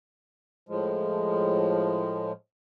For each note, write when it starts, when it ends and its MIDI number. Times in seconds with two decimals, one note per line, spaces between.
0.69 2.32 45
0.69 2.32 53
0.69 2.32 56